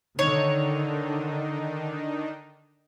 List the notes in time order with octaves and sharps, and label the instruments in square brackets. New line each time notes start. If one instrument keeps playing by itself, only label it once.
[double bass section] D3 [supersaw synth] D#3 D4 D#4 [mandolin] C#5